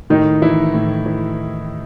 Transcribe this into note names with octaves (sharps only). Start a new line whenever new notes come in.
A2 D#3 D#4
E3 E4
A2
E3